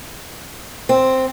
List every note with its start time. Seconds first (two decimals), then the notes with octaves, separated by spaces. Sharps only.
0.89 C4